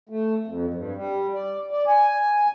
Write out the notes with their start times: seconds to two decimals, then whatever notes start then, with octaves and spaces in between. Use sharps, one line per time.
0.09 A3
0.46 F2
0.74 G2
0.95 G3
1.34 D5
1.71 D5
1.87 G#5